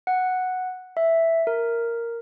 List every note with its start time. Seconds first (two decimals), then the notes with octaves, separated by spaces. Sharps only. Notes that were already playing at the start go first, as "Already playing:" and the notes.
0.07 F#5
0.97 E5
1.47 A#4